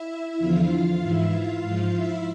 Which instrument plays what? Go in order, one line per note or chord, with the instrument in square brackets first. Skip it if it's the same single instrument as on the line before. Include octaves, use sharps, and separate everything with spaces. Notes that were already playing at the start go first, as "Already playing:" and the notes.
Already playing: [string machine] E4 E5
E2 D3 F3 F4 F5
G#2 E3 E4 E5
F4 F5
G#2 F3
E4 E5